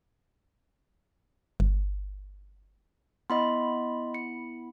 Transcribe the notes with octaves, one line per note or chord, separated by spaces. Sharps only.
G1
B3 E4 D#5 B5 C6
C#7